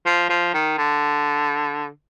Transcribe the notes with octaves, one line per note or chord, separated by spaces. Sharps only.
F3
F3
D#3
D3